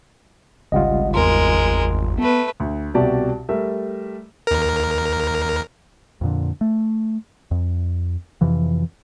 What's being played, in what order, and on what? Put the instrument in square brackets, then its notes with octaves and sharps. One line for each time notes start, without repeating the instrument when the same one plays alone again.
[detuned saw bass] G#1 [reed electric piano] C#2 G3 F4 [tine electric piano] D#5 F#5
[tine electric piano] E2 C6 [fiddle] G#3 A#4
[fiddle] A3 B4 [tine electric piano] B3
[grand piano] D2
C2 B2 F#4 G4 D5 A5
G3 A3 A#4 E5
[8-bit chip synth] D#2 A#4
[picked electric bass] F2 A#2 D3
A3
F2
F2 C3 E3 F3